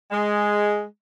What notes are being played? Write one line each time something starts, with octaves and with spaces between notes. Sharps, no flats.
G#3